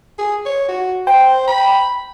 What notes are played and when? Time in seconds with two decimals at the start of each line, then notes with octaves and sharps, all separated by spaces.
0.18 G#4
0.45 C#5
0.69 F#4
1.07 C5 G5
1.48 B5